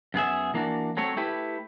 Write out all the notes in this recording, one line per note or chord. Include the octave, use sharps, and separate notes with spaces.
F#2 B3 G#4 E5
E3 A#3 D4 F#4
F#3 A3 C4 C#5
A3 E4 G4 B4